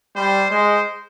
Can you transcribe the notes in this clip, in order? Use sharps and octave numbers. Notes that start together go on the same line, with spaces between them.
G3 C5
G#3 C5